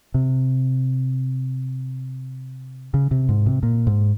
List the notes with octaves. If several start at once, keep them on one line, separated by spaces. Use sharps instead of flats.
C3
C#3
C3
G#2
C3
A#2
G#2